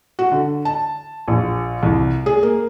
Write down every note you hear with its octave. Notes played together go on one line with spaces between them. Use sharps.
F#4
D3
A5
A#1
C2
G#4
A#3